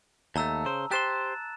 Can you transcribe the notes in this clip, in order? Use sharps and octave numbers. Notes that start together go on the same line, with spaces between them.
D#2 A3 A5 A#5 E6
C#3 C5
G4 C5 C6 F#6 A6 E7